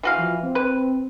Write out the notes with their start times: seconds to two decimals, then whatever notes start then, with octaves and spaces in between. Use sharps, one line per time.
0.03 E3 F#4 F5
0.18 F3
0.43 C4
0.55 B4